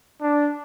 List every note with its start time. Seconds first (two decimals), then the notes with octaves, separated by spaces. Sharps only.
0.22 D4